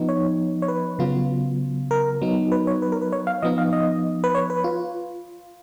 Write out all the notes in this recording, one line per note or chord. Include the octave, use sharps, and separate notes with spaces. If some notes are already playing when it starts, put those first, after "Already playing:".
Already playing: F3 B3 D#4
C#5
C#5
B4
C#3 F#3 B3 F4
A#4
F#3 B3 D#4
B4
C#5
B4
A#4
B4
C#5
F5
F3 B3 D#4 D#5
F5
D#5
B4
C#5
B4
F4